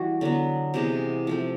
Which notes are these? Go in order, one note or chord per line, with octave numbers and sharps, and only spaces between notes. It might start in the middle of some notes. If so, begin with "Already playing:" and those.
Already playing: E3 G3 F#4
D3 F#3 B3
C3 E3 G#3 B3
F3 A3 C4